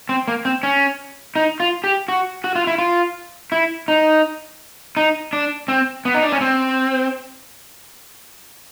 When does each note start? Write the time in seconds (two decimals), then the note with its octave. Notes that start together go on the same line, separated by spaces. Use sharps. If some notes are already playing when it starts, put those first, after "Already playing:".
0.09 C4
0.28 A#3
0.45 C4
0.63 C#4
1.36 D#4
1.60 F4
1.84 G4
2.08 F#4
2.44 F#4
2.55 F4
2.67 E4
2.78 F4
3.52 E4
3.88 D#4
4.97 D#4
5.33 D4
5.68 C4
6.05 B3
6.14 D#4
6.23 D4
6.32 C#4
6.41 C4